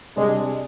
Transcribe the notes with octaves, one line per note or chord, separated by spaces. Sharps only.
C3 G3 G#3 D4 G#4 D5